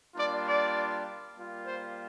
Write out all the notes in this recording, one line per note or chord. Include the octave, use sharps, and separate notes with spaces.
G3 A#3 D4 F4 D5
D5
G3 A#3 F4
C5